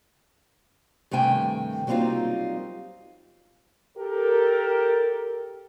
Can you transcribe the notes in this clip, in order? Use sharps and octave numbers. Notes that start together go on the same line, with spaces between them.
G2 C3 D#3 A3 G5 G#5
F#3 G3 A#3 C4 D#4 F4
G4 A4 A#4